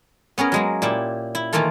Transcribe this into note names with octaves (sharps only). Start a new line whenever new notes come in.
B3 C#4 G#4 A#4
F#3 G#3 A#3
A#2 E4 G4 A5
E4
D#3 E3 A3 A#3 F4 A4